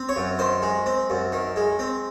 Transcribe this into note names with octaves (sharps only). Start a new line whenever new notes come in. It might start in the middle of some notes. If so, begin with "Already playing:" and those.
Already playing: C4
C#5
F#2
D#3 C5
G#3
C4
F#2
D#3
G#3
C4